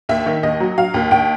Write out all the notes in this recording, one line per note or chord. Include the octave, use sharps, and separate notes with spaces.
D#2 E5
D#3
D#2 D#5
F#3
F#3 F5
D#2
D#2 G5